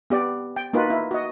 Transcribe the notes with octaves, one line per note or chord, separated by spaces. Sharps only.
B3 G4 D5
G5
A#3 D#4 F4 F#4 B4
E4
F#4 D#5